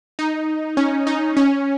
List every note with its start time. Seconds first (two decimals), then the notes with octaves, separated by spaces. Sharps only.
0.19 D#4
0.77 C#4
1.07 D#4
1.37 C#4